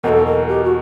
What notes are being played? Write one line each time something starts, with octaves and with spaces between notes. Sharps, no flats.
E2 B2 F#3 A#3 D#4 A4 A#4
A#4
G4
F#4